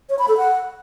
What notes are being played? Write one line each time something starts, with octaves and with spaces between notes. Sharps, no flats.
C#5
B5
A4
F#5